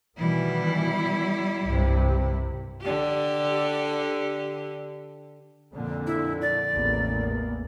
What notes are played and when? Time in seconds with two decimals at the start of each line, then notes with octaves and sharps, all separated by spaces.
0.18 B2 D#3 E3 G3 E4
1.64 C2 G2 C3
2.81 D3 G4
5.73 F2 A#2 D3
6.07 E4
6.42 D5
6.72 A1 E2 A#3